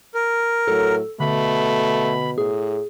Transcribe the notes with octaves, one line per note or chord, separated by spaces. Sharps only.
A#4
A2 F#3 A4
B2 D3 A3 B5
A2 G#4